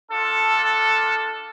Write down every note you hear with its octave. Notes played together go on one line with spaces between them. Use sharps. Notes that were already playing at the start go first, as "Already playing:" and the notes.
D4 F4 A4